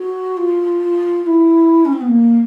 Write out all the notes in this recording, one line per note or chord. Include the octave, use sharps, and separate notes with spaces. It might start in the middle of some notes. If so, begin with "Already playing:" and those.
Already playing: F#4
F4
F4
E4
C#4
C4
B3
A#3